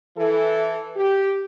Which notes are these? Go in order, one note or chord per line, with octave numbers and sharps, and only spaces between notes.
E3 A4
G4